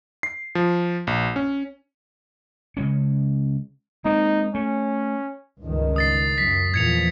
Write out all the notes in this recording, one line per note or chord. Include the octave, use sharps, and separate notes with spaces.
C7
F3
A#1
C#4
C#3 G#3 C#4
G#3 A#3 C4 D#4
A3 C#4
C#2 G2 D#3
D#6 A6 C7
F#2 B6
E2 A#2 F3 G#6 C#7 F7